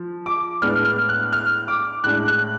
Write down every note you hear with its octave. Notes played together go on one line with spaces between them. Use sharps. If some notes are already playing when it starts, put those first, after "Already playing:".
Already playing: F3
D6
A2 G#3 B3 D4 F6
F6
F#6
F6
D6
A2 G#3 D4 F#6
F#6